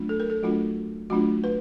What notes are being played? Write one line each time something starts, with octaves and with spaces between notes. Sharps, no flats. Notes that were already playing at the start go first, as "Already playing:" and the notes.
Already playing: F#3 A3 D4 F4
A4
A#4
A4
F#3 A3 D4 F4 F#4
F#3 A3 D4 F4 F#4
B4